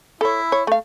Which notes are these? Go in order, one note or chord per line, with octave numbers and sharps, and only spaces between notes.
E4 A4 C#5
C#5
A3 F5